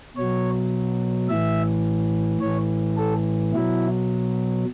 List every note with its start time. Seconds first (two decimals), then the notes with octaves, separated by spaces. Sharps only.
0.16 B2 F#3 C#5
1.29 A2 E3 E5
2.41 A2 E3 C#5
2.97 A4
3.53 B2 F#3 E4